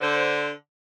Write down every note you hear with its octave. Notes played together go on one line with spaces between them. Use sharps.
D3 C5